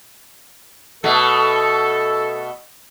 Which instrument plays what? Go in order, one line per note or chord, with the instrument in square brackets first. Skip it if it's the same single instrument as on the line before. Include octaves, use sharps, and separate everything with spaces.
[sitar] B2 A3 [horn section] A4